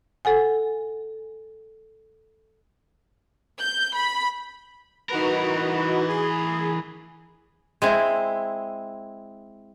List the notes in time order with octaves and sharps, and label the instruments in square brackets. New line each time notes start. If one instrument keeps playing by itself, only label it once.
[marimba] A4 F#5 G#5
[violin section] G6
B5
[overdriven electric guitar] E3 A#4 [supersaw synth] D#4 F#4 B4
[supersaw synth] G#4
[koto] G#3 C4 E4